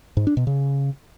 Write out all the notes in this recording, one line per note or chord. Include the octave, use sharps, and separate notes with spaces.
G#2
D4
B2
C#3